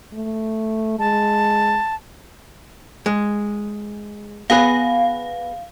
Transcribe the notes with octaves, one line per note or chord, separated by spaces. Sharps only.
A3
G#3 A5
G#3
B3 G#4 B4 F5